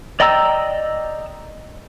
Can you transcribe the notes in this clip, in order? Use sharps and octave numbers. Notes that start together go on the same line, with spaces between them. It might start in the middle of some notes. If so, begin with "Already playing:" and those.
D5 D#5 G5 A#5 E6